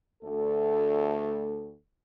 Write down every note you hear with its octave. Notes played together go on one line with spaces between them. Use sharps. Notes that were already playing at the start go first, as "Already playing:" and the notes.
D2 A3 A4